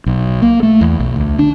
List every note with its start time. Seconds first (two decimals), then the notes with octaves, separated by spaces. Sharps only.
0.06 B1
0.42 A#3
0.63 A3
0.81 E2
0.99 B1
1.16 D2
1.39 D4